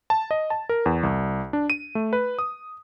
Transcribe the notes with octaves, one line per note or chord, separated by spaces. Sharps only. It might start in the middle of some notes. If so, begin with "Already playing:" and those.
A5
D#5
A5
A#4
E2
C2
D4
D#7
A3
B4
D#6